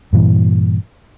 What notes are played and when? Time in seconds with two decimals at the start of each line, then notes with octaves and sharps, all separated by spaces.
0.13 G2 A#2 E3